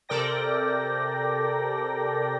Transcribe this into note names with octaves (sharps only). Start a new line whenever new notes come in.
C3 A4 A#4 D5 G5 A#6